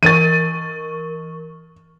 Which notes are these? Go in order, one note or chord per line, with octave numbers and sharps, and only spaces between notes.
E3 A#4 C#6 A6 D#7